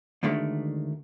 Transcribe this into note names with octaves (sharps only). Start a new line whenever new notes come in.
D2 D3 D#3 G#3 A3